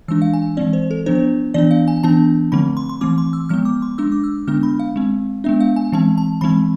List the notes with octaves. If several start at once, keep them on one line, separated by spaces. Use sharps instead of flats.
E3 G#3 D4 E6
F5
G#5
E3 G#3 C4 D5
C5
A4
F3 B3 D4 C5
E3 B3 D4 D5
F5
G#5
E3 B3 D4 A5
D3 F3 A3 C4 B5
C6
C6
E3 A3 C4 D6
C6
E6
F3 G#3 B3 F6
D6
C6
G#3 D4 E6
D6
E6
D3 G#3 B3 D4 F6
B5
F5
G#3 C4
G#3 B3 D4 E5
F5
G#5
E3 G#3 C4 A5
A5
E3 G#3 C4 B5